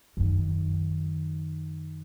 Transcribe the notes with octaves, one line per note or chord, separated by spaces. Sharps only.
F#2 D#3